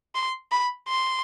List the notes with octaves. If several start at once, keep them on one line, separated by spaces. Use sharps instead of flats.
C6
B5
C6